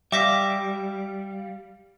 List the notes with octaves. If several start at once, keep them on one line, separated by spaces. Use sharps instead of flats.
G3 E5 F5 G5 D6 A#6 B6